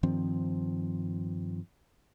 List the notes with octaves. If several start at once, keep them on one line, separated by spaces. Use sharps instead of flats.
G2 D#3 F3 C4